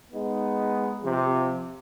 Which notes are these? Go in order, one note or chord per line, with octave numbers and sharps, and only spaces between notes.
G#3 B3 D#4
C3 F3